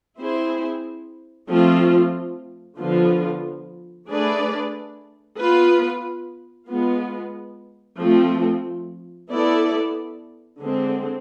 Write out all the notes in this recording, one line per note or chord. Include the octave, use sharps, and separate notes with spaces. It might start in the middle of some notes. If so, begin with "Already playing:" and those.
C4 E4 G#4 C5
F3 A3 C4 F4
D3 F3 B3 F4
A3 D4 G#4 B4 D5
B3 F4 B4
G#3 B3 F4
F3 A3 C4
B3 E4 A4 D5
D3 G#3 C4